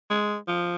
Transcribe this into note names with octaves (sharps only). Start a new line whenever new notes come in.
G#3
F3